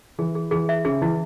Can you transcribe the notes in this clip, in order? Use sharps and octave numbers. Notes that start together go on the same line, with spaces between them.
E3 G#4
G#4
E3 G#4
E5
C#3 G#4
E3 E4